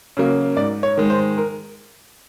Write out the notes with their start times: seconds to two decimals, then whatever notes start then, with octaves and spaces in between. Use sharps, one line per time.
0.17 C#3 F#3 A#3
0.57 G#2 D5
0.83 C#5
0.97 D#3 G#3
1.10 C5
1.38 A#4